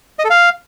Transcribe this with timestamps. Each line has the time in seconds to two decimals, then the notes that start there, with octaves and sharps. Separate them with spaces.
0.19 D#5
0.25 A4
0.30 F5